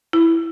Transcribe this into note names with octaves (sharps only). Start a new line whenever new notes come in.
E4